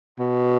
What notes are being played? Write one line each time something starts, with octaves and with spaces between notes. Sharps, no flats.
B2